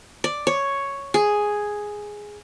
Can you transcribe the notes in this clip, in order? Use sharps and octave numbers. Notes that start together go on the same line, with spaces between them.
D5
C#5
G#4